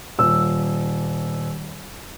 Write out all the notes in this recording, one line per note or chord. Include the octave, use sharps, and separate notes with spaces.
D#1 E6